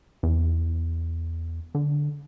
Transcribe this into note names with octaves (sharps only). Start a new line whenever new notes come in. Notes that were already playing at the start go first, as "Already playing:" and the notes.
E2
D3